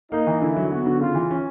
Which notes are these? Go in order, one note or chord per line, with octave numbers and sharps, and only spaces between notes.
A#3 D#4
E3
D3 E4
F#3
B3 F#4
D3
C#3 F4
E3
C#4